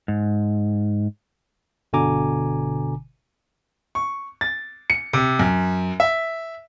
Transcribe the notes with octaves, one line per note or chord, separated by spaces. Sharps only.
G#2
G1 B2 D3 G#5 A#5 D6
C#6
A6
C#7
C3
F#2
E5